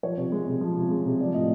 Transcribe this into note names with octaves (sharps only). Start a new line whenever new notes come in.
F3 C#5
C3
G#3
C3
F3
C3
G#3
C3
F3 D5
A2 D#5